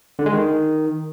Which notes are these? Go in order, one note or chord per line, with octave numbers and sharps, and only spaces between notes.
D3
G#3
D#3